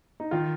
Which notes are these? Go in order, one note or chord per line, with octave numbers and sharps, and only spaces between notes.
D#4
D#3 F4